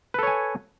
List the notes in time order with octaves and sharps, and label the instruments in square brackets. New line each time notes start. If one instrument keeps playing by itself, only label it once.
[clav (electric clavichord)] B4
A4
C#5
G#5